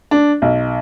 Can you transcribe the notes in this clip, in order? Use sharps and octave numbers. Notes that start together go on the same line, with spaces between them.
D4
B1